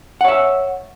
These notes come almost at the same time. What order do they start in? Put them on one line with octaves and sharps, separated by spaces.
F#5 C#5 E5